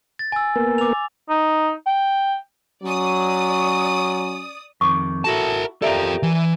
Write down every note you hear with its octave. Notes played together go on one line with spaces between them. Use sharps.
A6
G#5 E6
A#3 B3 A#4
D6 F7
D#4
G5
F#3 C#4 D5 D#6
F2 D#3 C#6 D6
E4 F#4 A4 A#4 A5
F4 G4 A4 A#4 D5 E5 F5 A#5
E3